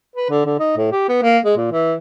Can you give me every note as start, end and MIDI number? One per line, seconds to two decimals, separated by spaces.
0.16 0.29 71
0.30 0.44 50
0.45 0.55 50
0.59 0.72 63
0.77 0.88 45
0.92 1.05 67
1.08 1.21 59
1.22 1.38 58
1.45 1.54 56
1.57 1.67 46
1.72 1.95 52